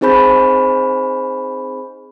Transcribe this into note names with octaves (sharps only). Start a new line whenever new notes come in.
C4 D#4 G#4 C5 B5 G6